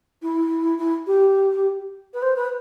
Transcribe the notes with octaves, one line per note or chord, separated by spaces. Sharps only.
E4
E4
G4
B4
C5
B4